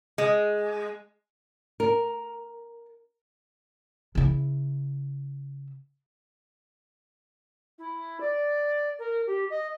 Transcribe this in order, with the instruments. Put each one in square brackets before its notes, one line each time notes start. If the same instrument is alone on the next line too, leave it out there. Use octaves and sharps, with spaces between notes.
[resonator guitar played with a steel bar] G#3
[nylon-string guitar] A#4
[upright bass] C#3 E4
[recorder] E4
D5
A#4
G4
D#5